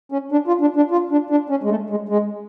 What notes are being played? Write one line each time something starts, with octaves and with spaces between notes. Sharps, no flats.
C#4
D4
F4
D4
D4
F4
D4
D4
C#4
G#3
A3
G#3
G#3